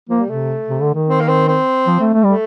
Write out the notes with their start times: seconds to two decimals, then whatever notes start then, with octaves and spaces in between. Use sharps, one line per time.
0.09 F3 A#3
0.19 G3
0.29 C3 A3
0.69 C3
0.81 D3
0.95 D#3
1.08 C4
1.20 A#3
1.28 C4
1.48 C4
1.87 F3
2.00 A3
2.14 A3
2.24 G3 A3